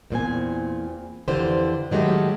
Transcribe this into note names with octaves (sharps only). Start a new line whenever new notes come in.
E2 A#2 C4 G#5
F2 D3 E3 F4 G4 C5
D#3 F#3 G#3 A3 G4